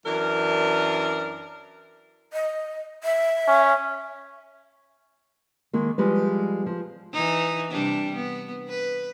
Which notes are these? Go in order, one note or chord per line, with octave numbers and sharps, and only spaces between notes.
F#2 E3 D4 A#4
D#5
E5
C#4
D#3 G#3 A#3
F3 G3 G#3 B4
F3
E3 D#4
C3 G3 D4
B3
B4